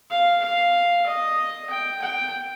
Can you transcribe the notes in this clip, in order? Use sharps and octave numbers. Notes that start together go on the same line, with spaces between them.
F5
F5
D#5
G5
G5